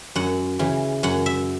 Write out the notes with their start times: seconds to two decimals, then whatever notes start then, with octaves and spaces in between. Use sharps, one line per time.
0.15 F#2 F#5
0.59 C#3 E3
1.03 F#2 F#5
1.26 E5